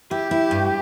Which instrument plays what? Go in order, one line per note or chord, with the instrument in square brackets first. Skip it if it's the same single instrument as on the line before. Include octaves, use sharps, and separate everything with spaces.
[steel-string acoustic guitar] E4 [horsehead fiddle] G4
[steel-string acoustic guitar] E4
G2